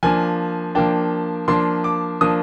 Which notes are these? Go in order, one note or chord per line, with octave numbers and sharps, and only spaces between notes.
F3 A#3 D4 G#5
F3 A#3 D4 G5
F3 A#3 D4 C6
D6
F3 A#3 D4 D#6